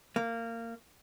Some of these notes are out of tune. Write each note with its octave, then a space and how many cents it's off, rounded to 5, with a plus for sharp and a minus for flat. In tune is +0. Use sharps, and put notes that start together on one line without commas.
A#3 -20